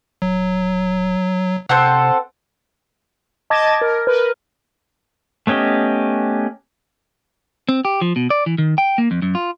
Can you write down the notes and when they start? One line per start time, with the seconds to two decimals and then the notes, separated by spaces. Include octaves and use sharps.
0.22 D#1 F#3
1.69 C3 C4 A4 F#5
3.50 D#5 A5 D6 G#6 A6
3.81 A#4
4.07 A#4 B4
5.47 A3 B3 C#4 G4 D#5
7.69 C4
7.85 G4
8.01 F3
8.16 B2
8.30 D5
8.46 E3
8.58 D#3
8.78 G5
8.98 A#3
9.11 F2
9.22 F#2
9.35 F4